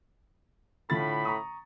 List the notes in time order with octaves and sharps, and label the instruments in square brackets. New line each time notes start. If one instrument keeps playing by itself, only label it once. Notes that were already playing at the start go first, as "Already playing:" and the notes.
[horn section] A2 B5 [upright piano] D3 F4 A6
[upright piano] A#5 C#6 D#6